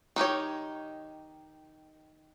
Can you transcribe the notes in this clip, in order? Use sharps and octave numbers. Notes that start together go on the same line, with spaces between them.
D#3 D#4 G4 C#5